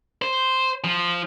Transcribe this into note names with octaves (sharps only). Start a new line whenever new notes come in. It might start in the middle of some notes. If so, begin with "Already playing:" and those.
C5
F3